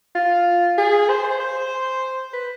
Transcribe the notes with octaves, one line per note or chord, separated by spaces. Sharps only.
F4
G#4
C5
C5
C5
B4